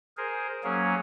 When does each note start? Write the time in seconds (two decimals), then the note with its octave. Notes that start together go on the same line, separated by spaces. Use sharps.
0.17 G#4 A#4 C5
0.64 F#3 A#3 C#4 G#4 C#5